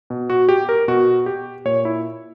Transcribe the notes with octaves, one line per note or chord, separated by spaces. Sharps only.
B2
F#4
G4
A#4
B2 F#4
G4
A#2 C#5
E4